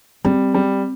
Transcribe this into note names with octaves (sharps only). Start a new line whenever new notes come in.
G3 C4
G3